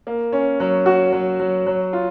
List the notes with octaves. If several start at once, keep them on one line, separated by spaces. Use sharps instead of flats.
A#3
C#4
F#3
F#4
F#3
F#3
F#3
F4